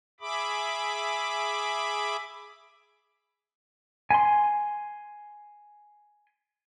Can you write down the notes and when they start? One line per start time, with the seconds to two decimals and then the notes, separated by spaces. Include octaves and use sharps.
0.20 G#4 E5 B5 D6
4.11 G#5 C6